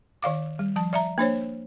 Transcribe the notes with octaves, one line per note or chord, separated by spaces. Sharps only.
D#3 D5 F5 D6
G3
F3 A5
D5 E5 A#5
A#3 D4 C5 C#5